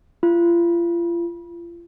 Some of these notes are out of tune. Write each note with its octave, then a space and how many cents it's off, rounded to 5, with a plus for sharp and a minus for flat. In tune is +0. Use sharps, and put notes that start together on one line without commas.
F4 -35